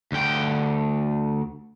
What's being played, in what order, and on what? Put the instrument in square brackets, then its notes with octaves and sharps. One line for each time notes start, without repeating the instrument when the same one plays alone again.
[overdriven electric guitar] D2 G5